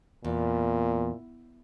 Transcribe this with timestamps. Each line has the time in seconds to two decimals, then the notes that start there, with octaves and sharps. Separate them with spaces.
0.25 E2 A#2